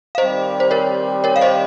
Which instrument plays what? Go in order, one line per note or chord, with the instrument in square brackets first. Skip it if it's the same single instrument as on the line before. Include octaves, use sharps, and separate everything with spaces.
[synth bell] F5
[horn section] D#3 G3 C4 G4 [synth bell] C5 D#5
[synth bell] C5
A#4 C#5
A#4 C#5
F5
C5 D#5